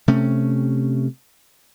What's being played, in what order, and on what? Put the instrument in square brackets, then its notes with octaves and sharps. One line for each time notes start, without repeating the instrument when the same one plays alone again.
[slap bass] C3 A3 C#4